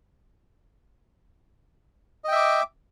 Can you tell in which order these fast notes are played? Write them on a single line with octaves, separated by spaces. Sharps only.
D#5 G5 E5 D6